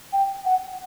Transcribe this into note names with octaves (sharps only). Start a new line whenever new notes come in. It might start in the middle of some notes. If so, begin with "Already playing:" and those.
G5
F#5